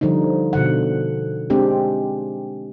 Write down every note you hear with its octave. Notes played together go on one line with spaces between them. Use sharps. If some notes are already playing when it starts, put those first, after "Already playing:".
D3 F3 G3 D#4
B2 D3 F#5
G#3 C4 D4 G4